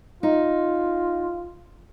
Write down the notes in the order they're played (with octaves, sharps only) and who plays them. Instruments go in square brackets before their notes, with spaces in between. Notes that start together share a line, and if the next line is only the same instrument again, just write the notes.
[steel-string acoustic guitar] D#4 [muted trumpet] F4